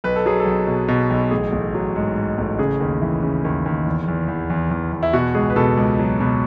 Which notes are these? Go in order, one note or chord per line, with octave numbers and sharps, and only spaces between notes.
B1 B4
A4
F#3 G#4
A4
B1
B2
B2
B1
A1 G#4
A1
F#3
G#2
G#2
A1
C#3 G#4
D#2
E3
C#3
D#2
D#2
E2
E2
E2
E2
E2
E2
E4
B2 F#4
C#2 G#4
B4
B2 A4
C#2
F#3
B2